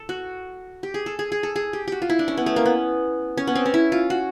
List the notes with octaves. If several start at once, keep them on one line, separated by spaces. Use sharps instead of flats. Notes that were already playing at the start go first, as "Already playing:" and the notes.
Already playing: A4
F#4
G4
G#4
A4
G#4
G#4
A4
G#4
G4
F#4 G4
F4
E4
D4
C#4
B3
A3
A#3
B3
C#4
B3
C4
C#4
E4
F4
F#4